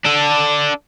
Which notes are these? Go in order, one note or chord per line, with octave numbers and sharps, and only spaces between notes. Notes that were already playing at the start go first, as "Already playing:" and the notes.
D4 A4